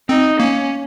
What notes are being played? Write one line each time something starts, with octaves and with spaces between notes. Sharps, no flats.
C4 D#4
A#3 C#4